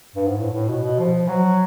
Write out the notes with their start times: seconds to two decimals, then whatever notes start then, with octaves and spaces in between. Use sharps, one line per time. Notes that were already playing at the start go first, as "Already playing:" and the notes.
0.16 G2
0.27 G#2
0.38 A2
0.53 A2
0.69 B2
0.84 B2
0.99 F3
1.28 F#3